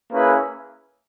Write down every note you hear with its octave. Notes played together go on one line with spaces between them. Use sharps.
A#3 C#4 E4 G#4 B4